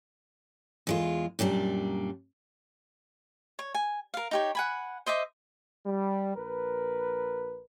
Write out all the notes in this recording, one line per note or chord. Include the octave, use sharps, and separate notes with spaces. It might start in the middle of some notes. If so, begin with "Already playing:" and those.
E2 G#3 F4
F#2 A#2 G3 D4
C#5
G#5
A#4 F5
D#4 G4 C#5
F#5 G#5 B5
C5 D#5 E5 D6
G3
A#1 A#4 B4